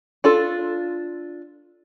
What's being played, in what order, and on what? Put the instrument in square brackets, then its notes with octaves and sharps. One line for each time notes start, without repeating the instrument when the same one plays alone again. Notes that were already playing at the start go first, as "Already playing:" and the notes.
[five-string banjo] D4 F4 A4